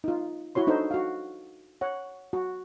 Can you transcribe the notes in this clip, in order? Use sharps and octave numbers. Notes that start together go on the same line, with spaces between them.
D#4 F4
E4 F#4 C#5 C6
D4 D#4 A4 C5
F#4 F5
C#5 F#5
F#4